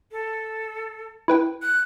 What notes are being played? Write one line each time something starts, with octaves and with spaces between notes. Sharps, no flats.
A4
E4 B4 G5
F#6